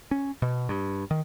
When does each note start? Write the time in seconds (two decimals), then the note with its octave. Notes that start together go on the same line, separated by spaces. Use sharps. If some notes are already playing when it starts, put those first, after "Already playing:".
0.11 C#4
0.42 B2
0.69 G2
1.11 D#3